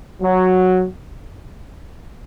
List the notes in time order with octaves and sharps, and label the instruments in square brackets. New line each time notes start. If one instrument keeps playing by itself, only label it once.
[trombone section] F#3